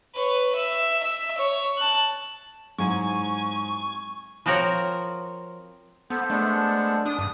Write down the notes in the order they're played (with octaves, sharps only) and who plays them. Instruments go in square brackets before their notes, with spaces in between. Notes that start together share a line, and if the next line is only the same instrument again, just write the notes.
[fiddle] B4 C#5
E5
E5
C#5
A5 F#6
[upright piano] G#2 [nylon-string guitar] F#3 C4 E4 [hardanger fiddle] G#5 [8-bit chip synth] C#6
[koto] F3 C4 F#4 A#4 C#5
[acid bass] B3 [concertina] A4 C5
[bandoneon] G#3 B3 D4 [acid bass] A3
[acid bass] D4 [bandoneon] D#6
[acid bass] G2 [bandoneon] D#6